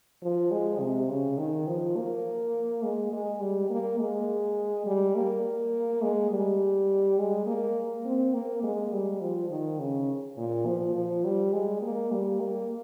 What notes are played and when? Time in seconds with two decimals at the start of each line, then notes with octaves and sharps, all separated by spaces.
0.23 F3
0.51 G#3
0.80 C3
1.10 C#3
1.38 D#3
1.67 F3
1.97 A#3
2.83 G#3
3.13 G#3
3.42 G3
3.70 A#3
4.00 G#3
4.86 G3
5.15 A#3
6.02 G#3
6.31 G3
7.19 G#3
7.47 A#3
8.05 C4
8.34 A#3
8.64 G#3
8.93 G3
9.21 F3
9.50 D#3
9.80 C#3
10.37 A#2
10.66 F3
10.95 F3
11.25 G3
11.53 G#3
11.82 A#3
12.11 G3
12.40 A#3